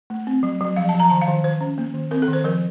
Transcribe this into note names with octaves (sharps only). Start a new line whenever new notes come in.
A3
C4
F#3
F#3
F3 F5
A5
F3
A#5
D#3 A5
F5
D#3
D#3 C5
C#4
A#3
D#3
C4 A#4
A4
D#3
C5
F3 A#4